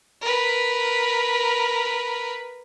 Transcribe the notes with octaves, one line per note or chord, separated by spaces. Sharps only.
A#4 B4